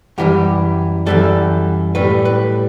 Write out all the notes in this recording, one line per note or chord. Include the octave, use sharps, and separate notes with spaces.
F#2 E3 G3 G4
F#2 E3 G3 A4
A2 G3 B4
B4